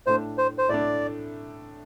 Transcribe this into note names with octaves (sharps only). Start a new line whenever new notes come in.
A2 A3 D4 C5
C5
C5
A2 A3 D4 D5